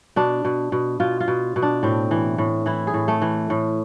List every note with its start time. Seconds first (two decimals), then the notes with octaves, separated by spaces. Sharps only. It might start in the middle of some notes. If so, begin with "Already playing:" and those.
0.16 B2 D4
0.45 B2
0.72 B2
1.00 B2 F4
1.20 F4
1.28 B2
1.56 B2
1.62 D4
1.83 A2 C4
2.11 E3
2.38 A2
2.66 E3 E4
2.87 G#4
2.94 A2
3.08 A3
3.22 E3
3.50 A2